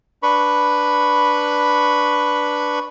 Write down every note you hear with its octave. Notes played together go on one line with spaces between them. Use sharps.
D4 B4 B5 C#6